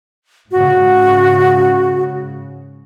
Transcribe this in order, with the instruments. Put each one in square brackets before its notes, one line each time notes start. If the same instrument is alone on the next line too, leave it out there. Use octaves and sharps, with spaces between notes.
[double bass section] G#2 C#3 [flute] F#4